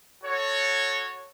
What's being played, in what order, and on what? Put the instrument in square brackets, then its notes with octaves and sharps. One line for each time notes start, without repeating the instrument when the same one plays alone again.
[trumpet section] F#4 A4 C#5